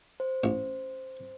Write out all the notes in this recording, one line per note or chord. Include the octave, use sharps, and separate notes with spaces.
C5
A1